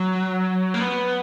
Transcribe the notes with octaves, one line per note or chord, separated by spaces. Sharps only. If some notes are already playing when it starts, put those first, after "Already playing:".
Already playing: F#3
A#3
B3